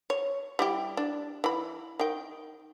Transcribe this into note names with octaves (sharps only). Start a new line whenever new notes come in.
C#5
G3 E4 G4
D4
E3 B5
D#3 G5